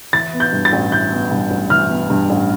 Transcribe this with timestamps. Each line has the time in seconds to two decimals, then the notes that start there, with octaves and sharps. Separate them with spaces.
0.13 E3 A6
0.33 B3
0.40 G6
0.53 G2
0.65 A6
0.73 A1
0.92 E3 G6
1.12 B3
1.31 G2
1.51 A1
1.70 E3 F6
1.90 B3
2.10 G2
2.30 A1